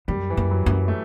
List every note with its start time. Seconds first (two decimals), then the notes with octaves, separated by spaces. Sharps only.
0.08 F#2 G3
0.30 E3
0.37 F#2
0.51 F#3
0.66 F#2
0.88 A3